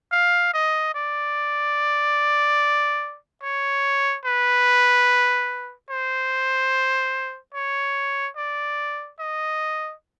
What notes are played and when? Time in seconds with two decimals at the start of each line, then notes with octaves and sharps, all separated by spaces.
0.12 F5
0.53 D#5
0.94 D5
3.42 C#5
4.24 B4
5.89 C5
7.54 C#5
8.36 D5
9.19 D#5